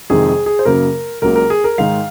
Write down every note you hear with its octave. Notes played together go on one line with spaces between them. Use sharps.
F2 C3 D#3 G#3 G#4
G#4
G#4
C5
F#2 C#3 F#3 A#3 A#4
C#2 C#3 F#3 A#3 A#4
A#4
G#4
A#4
G#2 D#3 G#3 F5